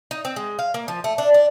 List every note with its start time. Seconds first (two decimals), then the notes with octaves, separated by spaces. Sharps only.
0.11 D#4
0.25 C4
0.36 G#3
0.59 F5
0.74 A#3
0.88 F3
1.04 A3
1.18 D4
1.34 D4